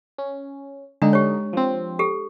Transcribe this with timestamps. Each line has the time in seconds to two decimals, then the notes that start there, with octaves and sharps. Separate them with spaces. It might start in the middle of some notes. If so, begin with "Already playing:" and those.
0.18 C#4
1.02 D3 G#3 D4 D#4
1.13 G4 C#5
1.53 F3 C4
1.99 G4 A4